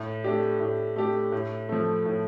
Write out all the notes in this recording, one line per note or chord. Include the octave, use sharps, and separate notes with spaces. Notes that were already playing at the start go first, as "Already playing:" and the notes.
Already playing: A2
A3 D4 G4
A2
A3 D4 G4
A2
F3 A3
A2